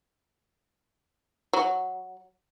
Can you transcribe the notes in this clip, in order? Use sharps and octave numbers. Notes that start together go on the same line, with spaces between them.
F#3